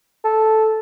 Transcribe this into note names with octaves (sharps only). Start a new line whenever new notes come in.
A4